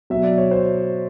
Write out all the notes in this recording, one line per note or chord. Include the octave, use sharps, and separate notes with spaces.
B2 F#3 E5
D5
C#5
C5